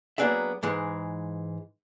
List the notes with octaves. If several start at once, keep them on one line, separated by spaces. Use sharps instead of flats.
F#3 A#3 B3 D4 G#4 E5
G#2 E3 G#3